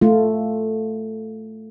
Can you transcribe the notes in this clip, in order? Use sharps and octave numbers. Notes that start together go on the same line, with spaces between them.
A3 F4